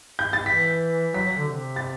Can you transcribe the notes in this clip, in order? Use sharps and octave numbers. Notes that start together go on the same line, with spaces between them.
G6
A6
E3 B6
F#3 B6
F#3
D3
C3
A6